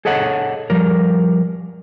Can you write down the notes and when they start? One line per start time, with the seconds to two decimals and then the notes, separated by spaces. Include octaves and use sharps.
0.05 G#4 A4 C#5 D#5 F#5
0.70 F3 G3 A#4